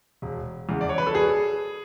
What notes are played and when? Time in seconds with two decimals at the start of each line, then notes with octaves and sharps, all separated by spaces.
0.22 E1
0.69 E2 C#3 E3
0.81 D5
0.89 C#5
0.98 B4
1.07 A4
1.15 G#4